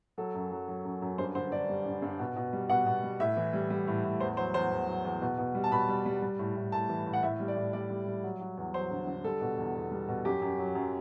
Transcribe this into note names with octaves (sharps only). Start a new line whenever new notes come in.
F#3 A4
F#2
F#3
F#3
F#2
F#2
G2 C5
D3 C5
D3 D5
G3
D3
G2
B2
B2
G3
B2 F#5
B2
G3
A2 E5
E3
G3
G3
A2
A2
E2 C5
F#3 C5
E2 C5
E2
F#3
E2
B2
B2
G3
A5
B2 B5
G3
G3
G3
A2
A2
A2 A5
E3
A2
F#5
A2 E5
G3
D5
A2
G3 D5
G3
G3
F#3
F#3
E2
F#3 C5
D3
D3
G3 A4
B2
E2
E2
G3
B2
F#2 G4
F#2
F#3
F#2